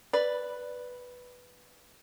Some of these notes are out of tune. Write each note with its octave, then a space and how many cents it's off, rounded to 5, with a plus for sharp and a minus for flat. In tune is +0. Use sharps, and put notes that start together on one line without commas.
B4 +0 D5 +0